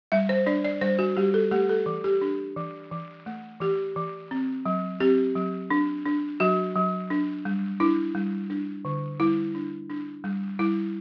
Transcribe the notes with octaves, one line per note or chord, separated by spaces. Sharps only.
G3 E5
C5
D4 D5
D5
G3 C5
F#4
G3 G4
A4
A3 G4
A4
E3
G4
D4
E3
E3
A3
E3 G4
E3
C4
F#3
C4 G4
F#3
D4
D4
F#3 F#4
F#3
D4
G3
D4 E4
G3
D4
D3
G3 E4
D4
D4
G3
G3 E4